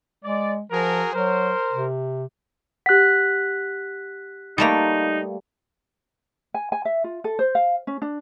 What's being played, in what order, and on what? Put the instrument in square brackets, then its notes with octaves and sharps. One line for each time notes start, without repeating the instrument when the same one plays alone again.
[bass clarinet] G#3 [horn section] D5
[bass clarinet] F3 [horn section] F#4 G#4 A#4
[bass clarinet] F#3 [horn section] A#4 C5
[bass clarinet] C3
[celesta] G4 F#5 [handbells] F#6 B6
[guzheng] G3 A3 A#3 [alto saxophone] D#4
[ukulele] G#5
G#5
E5
F4
A4
C5
F5
C#4
D4